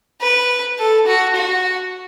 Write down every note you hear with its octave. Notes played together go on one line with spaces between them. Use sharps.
B4
A4
F#4
F#4